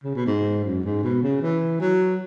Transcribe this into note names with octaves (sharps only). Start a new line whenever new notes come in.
C#3
B2
G#2
F#2
G#2
B2
C#3
E3
F#3